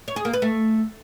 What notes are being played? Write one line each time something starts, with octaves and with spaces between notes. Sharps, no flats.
C#5
G#4
A#3
B4
A3